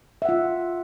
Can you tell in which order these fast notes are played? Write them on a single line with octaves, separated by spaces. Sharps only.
E5 F#5 F4